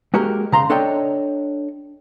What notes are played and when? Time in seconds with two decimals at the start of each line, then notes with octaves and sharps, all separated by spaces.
0.14 G#3 A#3 F#4 G4 A#4
0.52 C#3 A#5 C6
0.70 D4 A4 C#5 D#5 G5